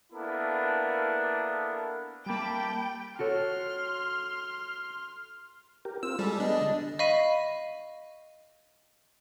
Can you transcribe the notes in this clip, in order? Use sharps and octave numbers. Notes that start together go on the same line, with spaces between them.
A#3 B3 D4 E4 A4 A#4
G3 A#3 G5 A5 B5 D6
F#4 A4 C#5 C6 F6
G4 A#4
C4 F4 E6
G3 G#3 A4
G#3 B3 D4 D#5
D3
D#5 F5 B5 C#6 B6 D#7